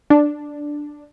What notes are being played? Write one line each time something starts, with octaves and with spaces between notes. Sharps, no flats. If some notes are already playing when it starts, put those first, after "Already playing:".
D4